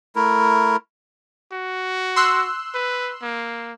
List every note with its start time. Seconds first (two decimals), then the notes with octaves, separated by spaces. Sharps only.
0.16 A3 E4 A#4
1.52 F#4
2.16 C6 E6 F#6
2.74 B4
3.22 A#3